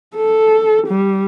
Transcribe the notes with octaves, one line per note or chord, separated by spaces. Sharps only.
A4
G3